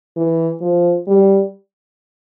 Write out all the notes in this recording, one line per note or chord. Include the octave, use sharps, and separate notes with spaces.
E3
F3
G3